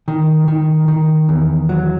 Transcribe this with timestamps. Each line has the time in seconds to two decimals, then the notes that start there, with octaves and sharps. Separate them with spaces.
0.08 D#3
0.48 D#3
0.88 D#3
1.29 E2
1.69 F#3